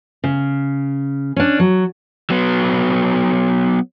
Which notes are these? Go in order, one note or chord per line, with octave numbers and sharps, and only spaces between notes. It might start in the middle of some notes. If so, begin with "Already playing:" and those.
C#3
C#4 D4
F#3
F#3 B3